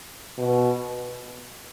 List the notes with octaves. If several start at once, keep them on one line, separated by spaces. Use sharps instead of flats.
B2